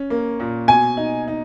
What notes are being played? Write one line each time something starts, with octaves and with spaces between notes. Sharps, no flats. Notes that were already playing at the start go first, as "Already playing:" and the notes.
Already playing: C#4
A#3
A#2
B2 G#5
D#4
D#4